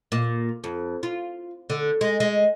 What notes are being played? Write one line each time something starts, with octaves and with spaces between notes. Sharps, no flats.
A#2
F2
F4
D3
G#3
G#3